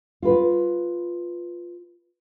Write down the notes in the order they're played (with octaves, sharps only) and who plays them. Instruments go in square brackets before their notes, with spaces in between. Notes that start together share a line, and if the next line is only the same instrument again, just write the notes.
[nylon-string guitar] F4 B4